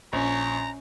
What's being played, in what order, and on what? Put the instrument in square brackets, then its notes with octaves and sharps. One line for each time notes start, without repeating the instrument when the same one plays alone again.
[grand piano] A#1 [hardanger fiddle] C#4 [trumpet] A#5